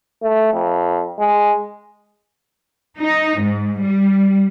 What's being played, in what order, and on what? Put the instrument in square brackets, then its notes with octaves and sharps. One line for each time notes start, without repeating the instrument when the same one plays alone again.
[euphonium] A3
F2
G#3
[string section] D#4
G#2
G3